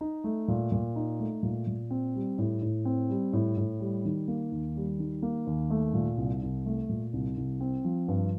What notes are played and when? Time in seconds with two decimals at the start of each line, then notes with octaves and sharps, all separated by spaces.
0.01 D#4
0.24 A3
0.48 A#2
0.72 A#2
0.96 D#4
1.20 A3
1.43 A#2
1.67 A#2
1.91 C4
2.15 G3
2.38 A2
2.62 A2
2.85 C4
3.09 G3
3.33 A2
3.57 A2
3.80 G3
4.05 D#3
4.28 A#3
4.52 D#2
4.76 G3
5.00 D#3
5.22 A#3
5.47 D#2
5.70 A3
5.94 A#2
6.18 C2
6.42 C2
6.66 A3
6.89 A#2
7.13 C2
7.37 C2
7.61 C4
7.84 F3
8.08 G2